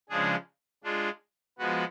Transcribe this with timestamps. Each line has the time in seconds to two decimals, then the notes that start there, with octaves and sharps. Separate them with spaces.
0.09 C#3 F3 G#3 D4 G#4
0.84 G#3 D4 F4
1.59 F3 G#3 B3 F#4